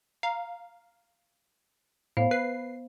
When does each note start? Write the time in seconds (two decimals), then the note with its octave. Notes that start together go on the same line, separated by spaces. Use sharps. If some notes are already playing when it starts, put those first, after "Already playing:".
0.23 F5 A#5
2.17 A2 B3 C5 F5
2.31 B4 C7